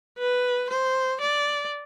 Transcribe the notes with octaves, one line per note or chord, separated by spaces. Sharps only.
B4
C5
D5